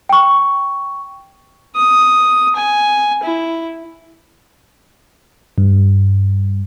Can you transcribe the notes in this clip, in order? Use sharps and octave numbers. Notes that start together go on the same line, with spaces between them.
G5 C#6
D#6
G#5
E4
G2